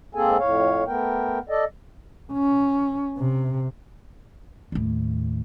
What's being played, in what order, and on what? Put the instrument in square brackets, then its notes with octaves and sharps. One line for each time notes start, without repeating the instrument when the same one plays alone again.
[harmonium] G#2 A#3 C4 G#4 A4 G#5
F2 A2 C#5 F5
A3 B3 A#4 G5
A4 D5 D#5
[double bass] C#4
C3
[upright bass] D#2 A2